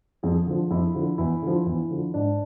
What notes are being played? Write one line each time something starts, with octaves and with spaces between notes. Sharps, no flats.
F2 G#4
D3 F3
F2 E4
D3 F3
E2 E4
D3 F3
E2 E4
D3 F3
G#2 D4